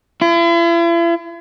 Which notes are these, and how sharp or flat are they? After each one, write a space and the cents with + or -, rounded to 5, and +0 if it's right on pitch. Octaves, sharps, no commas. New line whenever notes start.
E4 +45